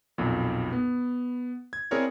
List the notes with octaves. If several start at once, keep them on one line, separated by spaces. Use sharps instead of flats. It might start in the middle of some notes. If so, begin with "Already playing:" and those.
B1 F2 A#2
B3
G#6
C4 E4 G#4 A#4 C#5 D5